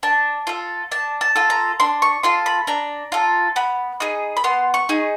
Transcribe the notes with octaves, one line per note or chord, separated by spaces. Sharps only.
D4 A5
F4 A4
D4 A5
A5
F4 A4
A#5
D4 C6
C#6
F4 A4 C6
B5
D4 A#5
F4 A4
B3 B5
D#4 G#4
B5
B3 C6
C#6
D#4 G#4